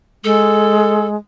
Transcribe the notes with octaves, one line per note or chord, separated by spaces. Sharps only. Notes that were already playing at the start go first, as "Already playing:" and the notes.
G#3 A4